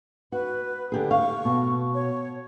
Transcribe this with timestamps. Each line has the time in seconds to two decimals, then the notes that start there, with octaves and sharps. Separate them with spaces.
0.32 F#4 B4
0.92 D3 G4 G#4
1.11 F5 C#6
1.45 B2
1.94 C#5